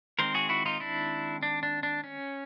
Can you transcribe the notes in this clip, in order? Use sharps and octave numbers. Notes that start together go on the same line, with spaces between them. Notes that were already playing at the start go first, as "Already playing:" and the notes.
D#3 G#3 C4 A#4 C5
F#4 G#4
E4 F#4
D#4 F4
D4 E4
D4
D4
D4
C#4